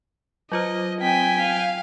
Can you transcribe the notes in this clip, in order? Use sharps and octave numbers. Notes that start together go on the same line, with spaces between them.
F#3 F4 C5 D#5
C4 G5 G#5 B6
F5